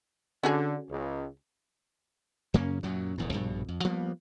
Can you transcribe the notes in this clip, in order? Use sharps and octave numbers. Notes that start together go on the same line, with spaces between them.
D3 C#4 F#4 G#4
C#2
F#2 C#3 A#3 C#4
F#2 A#2 F#3
D#1 E2 A#2
A#1 G2 B2
F2
F3 G3 A#3 B3